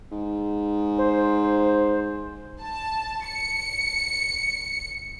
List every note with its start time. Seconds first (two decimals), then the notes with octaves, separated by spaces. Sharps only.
0.11 G#2
0.98 C5
2.61 A5
3.27 C#7